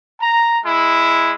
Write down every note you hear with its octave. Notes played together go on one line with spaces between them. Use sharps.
A#5
G#3 E4